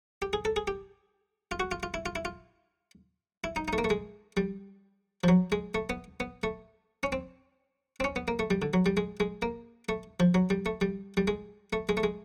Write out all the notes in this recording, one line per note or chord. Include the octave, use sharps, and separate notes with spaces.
G4
G#4
A4
G#4
G4
F4
F#4
F4
F4
E4
F4
E4
F4
E4
D#4
A3 D#4
A#3
A3
G#3
G3
F3
F#3
G#3
A3
B3
B3
A3
C#4
C4
C4
C#4
B3
A#3
A3
G3
D3
F#3
G3
G#3
G#3
A#3
A3
F3
F#3
G3
A3
G3
G3
G#3
A3
G#3
A3
G#3